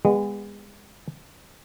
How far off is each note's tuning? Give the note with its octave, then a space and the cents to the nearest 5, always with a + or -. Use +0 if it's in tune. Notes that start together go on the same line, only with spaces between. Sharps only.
G#3 -30 B3 +0